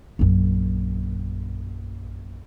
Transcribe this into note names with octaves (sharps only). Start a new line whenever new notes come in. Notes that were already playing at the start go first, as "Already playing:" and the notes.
A#1 F#2